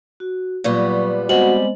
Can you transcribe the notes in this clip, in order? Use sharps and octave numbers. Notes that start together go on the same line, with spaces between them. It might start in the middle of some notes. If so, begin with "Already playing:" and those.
F#4
A#2 F#3 G3 B3 C#6
G3 G#3 B3 C4 F#4 C5 D#5 F#7